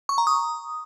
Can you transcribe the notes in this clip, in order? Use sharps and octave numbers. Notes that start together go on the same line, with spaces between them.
C#6
A#5
D#6